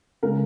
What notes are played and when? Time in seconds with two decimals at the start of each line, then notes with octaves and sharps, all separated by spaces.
0.23 C#3 G#3 A#4